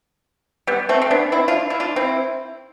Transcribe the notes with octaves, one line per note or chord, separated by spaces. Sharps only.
G3 B3
A3 C4
C4
B3 D4
C4 E4
D4 F4
E4
D4 F4
C4 E4